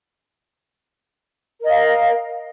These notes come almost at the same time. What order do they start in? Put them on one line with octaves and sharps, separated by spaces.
A#4 D#5 F5